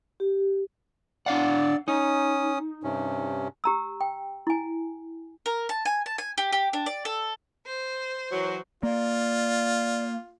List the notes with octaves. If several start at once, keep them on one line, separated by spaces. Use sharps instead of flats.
G4
D4 D5 F5 F#5
C#4 D#4 D#6
G2 C3 C#4
G4 A#5 E6
G5
E4 G#5
A#4
A5
G#5
A5
G#5
G4
G4
D4
D5
A4
C5
E3 F#3
A#3 F4 D5